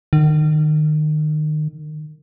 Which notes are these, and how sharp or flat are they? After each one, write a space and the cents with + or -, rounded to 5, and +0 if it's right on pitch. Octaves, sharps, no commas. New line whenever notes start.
D#3 -30